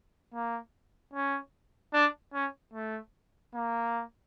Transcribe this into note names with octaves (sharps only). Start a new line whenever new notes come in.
A#3
C#4
D4
C#4
A3
A#3